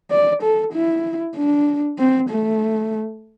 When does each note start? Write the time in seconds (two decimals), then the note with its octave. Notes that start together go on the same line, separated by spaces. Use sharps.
0.11 D5
0.42 A4
0.73 E4
1.36 D4
1.98 C4
2.30 A3